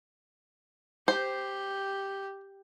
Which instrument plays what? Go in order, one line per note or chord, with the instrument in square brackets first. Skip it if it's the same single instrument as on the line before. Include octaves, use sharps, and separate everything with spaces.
[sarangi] G4 [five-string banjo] C5